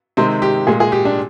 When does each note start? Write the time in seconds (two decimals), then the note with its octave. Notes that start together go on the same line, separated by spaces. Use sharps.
0.17 C3 D#3 G#3 C4
0.42 G4
0.67 A#2 G#3 G#4
0.80 G#4
0.92 G4
1.05 D4